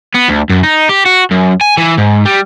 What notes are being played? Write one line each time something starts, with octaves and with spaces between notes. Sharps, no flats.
B3
D2
F#2
D#4
G4
F#4
F#2
G#5
E3
G#2
G3